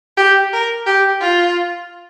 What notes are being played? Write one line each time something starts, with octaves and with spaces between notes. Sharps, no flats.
G4
A#4
G4
F4